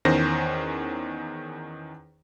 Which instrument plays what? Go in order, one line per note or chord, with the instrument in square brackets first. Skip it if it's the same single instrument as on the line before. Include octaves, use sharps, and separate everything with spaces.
[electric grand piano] E2 D#3 C#4 C5 A#6